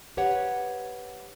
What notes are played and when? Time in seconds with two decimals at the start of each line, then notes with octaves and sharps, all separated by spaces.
0.17 G4 B4 C#5 F#5